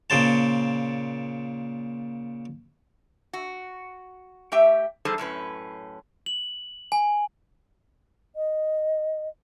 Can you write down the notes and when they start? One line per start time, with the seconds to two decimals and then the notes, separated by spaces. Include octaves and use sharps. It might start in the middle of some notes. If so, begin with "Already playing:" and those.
0.10 A#2 C#3 C5 A5
3.33 F#4
4.52 A3 G4 E5 G5
5.05 E2 G3 D#4 G#4 A4 C5
5.18 F#2 A2 C#4 B4
6.26 F#7
6.92 G#5
8.35 D#5